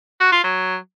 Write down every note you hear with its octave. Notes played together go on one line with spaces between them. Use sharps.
F#4
F4
F#3